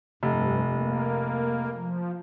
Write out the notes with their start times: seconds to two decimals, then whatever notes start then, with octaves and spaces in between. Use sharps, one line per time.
0.23 F1 G2
0.73 A#3
1.74 F3